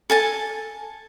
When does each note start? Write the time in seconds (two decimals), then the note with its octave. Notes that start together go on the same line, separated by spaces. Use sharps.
0.10 A4 G#5 A5